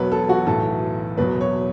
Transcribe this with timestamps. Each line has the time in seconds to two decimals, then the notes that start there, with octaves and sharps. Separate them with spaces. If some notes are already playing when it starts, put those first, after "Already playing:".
Already playing: E1 E2 B2 F#3 B4 C#5
0.12 A4
0.29 F#4
0.47 B1 A2 E3 A4
1.17 E1 E2 B2 F#3 B4
1.41 C#5